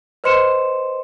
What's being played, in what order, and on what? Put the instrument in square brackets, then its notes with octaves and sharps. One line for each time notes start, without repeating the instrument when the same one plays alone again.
[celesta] B4 C5 D#5 C6 C#7 E7